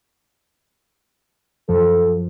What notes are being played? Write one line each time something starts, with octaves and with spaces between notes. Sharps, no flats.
F#2 F3 A4